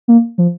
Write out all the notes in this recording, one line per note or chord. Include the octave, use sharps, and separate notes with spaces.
A#3
F3